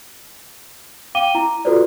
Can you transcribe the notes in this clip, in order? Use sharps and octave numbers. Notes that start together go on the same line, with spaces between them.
F5 G5 D6 D#7 G7
E4 A#5
F4 F#4 A4 B4 C5 D5